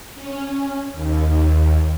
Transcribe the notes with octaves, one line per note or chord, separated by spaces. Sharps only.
C#4
D#2